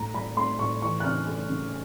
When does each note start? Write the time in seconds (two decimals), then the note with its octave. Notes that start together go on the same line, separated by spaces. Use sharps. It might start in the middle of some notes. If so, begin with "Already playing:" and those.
Already playing: A2 A#5
0.14 A2 B5
0.37 A3 C6
0.59 A2 C#6
0.82 E3 C#6
1.00 F#6
1.04 C#3 F6
1.27 A3
1.49 C#3